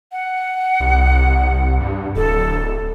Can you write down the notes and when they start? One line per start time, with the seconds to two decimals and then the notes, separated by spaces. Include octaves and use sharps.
0.12 F#5
0.80 C2
1.80 G2
2.16 D1 A4